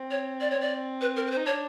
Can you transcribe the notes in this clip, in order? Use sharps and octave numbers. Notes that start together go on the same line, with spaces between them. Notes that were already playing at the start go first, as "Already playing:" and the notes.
Already playing: C4
C#5
D5
C4 C#5
D5
B4
A#4
B4
C5
D#4
D4 C#5